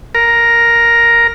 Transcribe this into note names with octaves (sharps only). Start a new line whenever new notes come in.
A#4